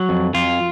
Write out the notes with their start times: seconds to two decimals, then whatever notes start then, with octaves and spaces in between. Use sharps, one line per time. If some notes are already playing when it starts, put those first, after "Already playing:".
Already playing: F#3
0.09 F2
0.34 F2 F4